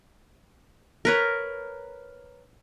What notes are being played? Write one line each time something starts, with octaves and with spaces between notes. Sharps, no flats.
A#4 B4 C#5